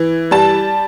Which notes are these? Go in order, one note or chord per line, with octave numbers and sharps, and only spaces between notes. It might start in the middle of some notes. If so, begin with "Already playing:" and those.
Already playing: E3
G3 A5